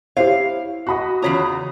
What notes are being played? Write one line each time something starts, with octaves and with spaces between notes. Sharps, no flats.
E4 G4 C5 C#5 F5
F#4 D#5 F#5 B5
E2 C#3 F4 C#5 A#5 D#6 B6